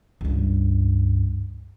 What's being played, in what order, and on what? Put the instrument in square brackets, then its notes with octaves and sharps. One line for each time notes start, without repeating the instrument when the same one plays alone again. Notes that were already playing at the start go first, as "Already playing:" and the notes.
[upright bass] C#2 G2